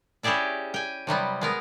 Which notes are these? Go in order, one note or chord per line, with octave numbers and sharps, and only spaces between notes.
C#4 E4 G4 G#4 D5 E5
G5 G#5
C3 F#3 G3 B3
G#3 B3 A#4